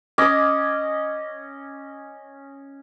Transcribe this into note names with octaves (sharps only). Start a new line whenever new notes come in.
C#4 D#5 D6